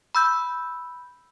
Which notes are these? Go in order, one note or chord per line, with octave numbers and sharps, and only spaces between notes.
B5 E6 G6